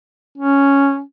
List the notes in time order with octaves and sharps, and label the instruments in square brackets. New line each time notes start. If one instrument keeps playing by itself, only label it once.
[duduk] C#4